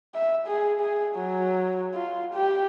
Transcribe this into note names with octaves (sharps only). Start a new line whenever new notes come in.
E5
G#4
G#4
F#3
F4
G4